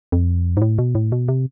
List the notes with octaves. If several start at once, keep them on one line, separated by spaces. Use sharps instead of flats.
F2
G#2
A2
B2
A2
B2
C3